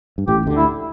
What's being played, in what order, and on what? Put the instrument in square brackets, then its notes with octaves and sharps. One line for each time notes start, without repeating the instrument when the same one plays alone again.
[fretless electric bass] G2
[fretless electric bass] A1 A2 [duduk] G4
[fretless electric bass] D2 D3
[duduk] E4